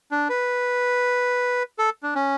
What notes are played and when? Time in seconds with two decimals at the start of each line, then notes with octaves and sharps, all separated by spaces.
0.11 D4
0.29 B4
1.79 A4
2.03 D4
2.15 C#4